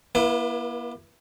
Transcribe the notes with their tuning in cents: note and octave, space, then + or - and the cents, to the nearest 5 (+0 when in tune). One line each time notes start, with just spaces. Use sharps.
A#3 +40 E4 +15 B4 -25